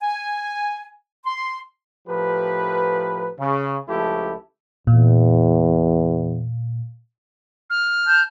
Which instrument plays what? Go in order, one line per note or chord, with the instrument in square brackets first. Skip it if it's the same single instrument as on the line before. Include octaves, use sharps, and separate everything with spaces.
[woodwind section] G#5
C6
[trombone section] A2 F3 G4 A#4 B4
C#3
C#2 F3 A3 E4 G4 A4
[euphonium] E2 [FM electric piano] A#2
[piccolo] F6
[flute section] A5 G6